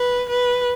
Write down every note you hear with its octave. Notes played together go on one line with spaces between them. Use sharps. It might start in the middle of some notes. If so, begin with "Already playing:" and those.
Already playing: B4
B4